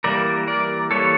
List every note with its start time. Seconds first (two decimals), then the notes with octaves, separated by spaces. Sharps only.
0.04 E3 G3 A#3 A#4 D5
0.47 A#4 D5
0.91 E3 G3 A#3 A4 C#5